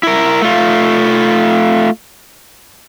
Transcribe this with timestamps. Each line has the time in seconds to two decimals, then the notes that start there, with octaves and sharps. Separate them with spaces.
0.03 E4 A#4
0.42 A3 F4